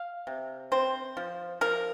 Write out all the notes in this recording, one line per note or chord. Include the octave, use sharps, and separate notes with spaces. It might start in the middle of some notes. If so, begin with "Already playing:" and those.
Already playing: F5
C3
C4 C5
F3
F3 A#4